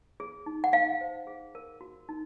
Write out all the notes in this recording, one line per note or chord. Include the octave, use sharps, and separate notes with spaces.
G#4
D#4
F#5
D#4 F5
C5
G#4
A#4
F#4
D#4